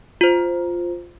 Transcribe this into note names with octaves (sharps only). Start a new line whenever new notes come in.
F4 C5